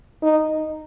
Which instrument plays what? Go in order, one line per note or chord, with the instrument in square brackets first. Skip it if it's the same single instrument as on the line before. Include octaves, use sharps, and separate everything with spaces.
[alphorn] D#4